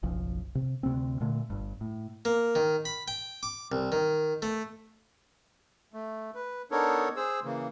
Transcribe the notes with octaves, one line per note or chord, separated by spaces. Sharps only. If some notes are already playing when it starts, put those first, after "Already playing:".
F#1 B1 F3
C3
D2 C3 B3 C4
A#2 D3 A3
G1 G2
A2
A#3
D#3
B5
G5
D6
C2
D#3
A3
A3
B4
B3 D4 D#4 A4 A#4 C#5
G#4 C5 E6
C#3 E3 A#3